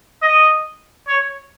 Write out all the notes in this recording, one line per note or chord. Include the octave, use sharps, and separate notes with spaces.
D#5
C#5